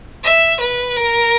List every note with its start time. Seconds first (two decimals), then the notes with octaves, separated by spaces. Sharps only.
0.24 E5
0.61 B4
0.97 A#4